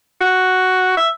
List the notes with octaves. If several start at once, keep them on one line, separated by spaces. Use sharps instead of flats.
F#4
E5